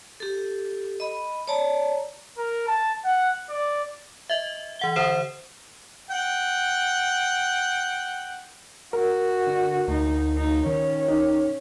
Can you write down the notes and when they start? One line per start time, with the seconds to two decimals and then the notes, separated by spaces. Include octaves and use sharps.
0.20 G4 A4
1.00 D#5 B5
1.47 C#5 D5 A5 A#5
2.38 A#4
2.68 A5
3.05 F#5
3.49 D5
4.30 D#5 E5
4.79 E3 F#5 G7
4.96 D3 C5 F#5 D#6 C7 E7
6.10 F#5 G5
8.93 F#4 A#4
9.47 D3
9.88 D2 D#4
10.38 D#4
10.66 D#3 C#4
11.08 D#4